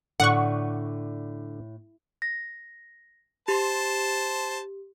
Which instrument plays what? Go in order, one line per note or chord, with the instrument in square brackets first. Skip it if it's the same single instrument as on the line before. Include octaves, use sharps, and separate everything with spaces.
[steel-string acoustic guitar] A2 [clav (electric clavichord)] D3 D5 [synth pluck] F#5 C#6
[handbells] A#6
[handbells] G4 [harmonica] C5 A5